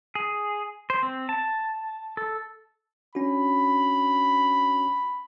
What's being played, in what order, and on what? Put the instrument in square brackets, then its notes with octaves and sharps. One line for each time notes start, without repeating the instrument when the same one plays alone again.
[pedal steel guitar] G#4
C5
C4
A5
A4
[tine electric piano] C#4 D4 F#4 [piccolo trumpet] B5